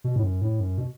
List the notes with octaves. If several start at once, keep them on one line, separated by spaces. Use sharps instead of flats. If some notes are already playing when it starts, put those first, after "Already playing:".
B2
A2
F#2
A2
F#2
B2